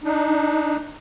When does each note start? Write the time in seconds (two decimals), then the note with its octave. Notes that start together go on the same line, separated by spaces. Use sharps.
0.04 D4 D#4